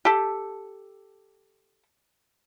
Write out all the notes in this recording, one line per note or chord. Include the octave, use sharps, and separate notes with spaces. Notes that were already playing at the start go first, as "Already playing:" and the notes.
G4 A4